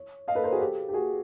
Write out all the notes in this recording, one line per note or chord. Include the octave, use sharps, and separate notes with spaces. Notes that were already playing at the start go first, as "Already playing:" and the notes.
Already playing: C#5
D#5 F5
A4 B4
A#4 C5
F#4 G#4
G4 A4
G4
F#4 G#4